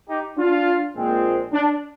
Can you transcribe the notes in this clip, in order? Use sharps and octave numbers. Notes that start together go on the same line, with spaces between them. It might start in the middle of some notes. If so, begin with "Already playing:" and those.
D#4 G4
D4 F4
A#1 A#2 G#3 C4
D4